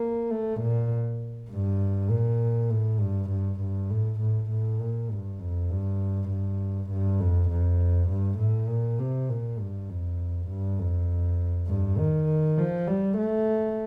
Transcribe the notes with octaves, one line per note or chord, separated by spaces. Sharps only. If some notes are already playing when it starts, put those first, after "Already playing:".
Already playing: A#3
A3
A#2
G2
A#2
A2
G2
G2
G2
A2
A2
A2
A#2
G2
F2
G2
G2
G2
F2
F2
G2
A2
A#2
C3
A#2
G2
F2
G2
F2
G2
D#3
F3
G3
A3